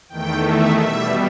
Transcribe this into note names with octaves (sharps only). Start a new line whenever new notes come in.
E2 D#3 A3 G5
E5
B2 G3 E5